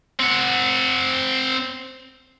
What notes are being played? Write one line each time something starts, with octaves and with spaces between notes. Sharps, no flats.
C4 F#5